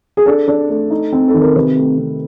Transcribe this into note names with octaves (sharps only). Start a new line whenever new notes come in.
G#4
D4 A4
D4
A3
D#4
C4
A4
D#3
A#4
C3 B4
A3
C3